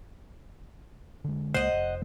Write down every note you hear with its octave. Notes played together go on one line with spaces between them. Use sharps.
D3 G#3
C#2 G#3 A#3 C5 D#5 F#5
F1